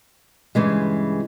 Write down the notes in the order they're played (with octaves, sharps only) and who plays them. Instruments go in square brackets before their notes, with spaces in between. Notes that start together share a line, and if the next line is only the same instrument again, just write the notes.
[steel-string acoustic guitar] G2 C#3 E3 G#3